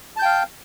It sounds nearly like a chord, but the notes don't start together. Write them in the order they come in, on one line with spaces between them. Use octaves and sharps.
A5 G6 G5 F5